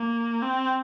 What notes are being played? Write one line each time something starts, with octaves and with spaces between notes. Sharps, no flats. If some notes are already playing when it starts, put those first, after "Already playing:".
Already playing: A#3
C4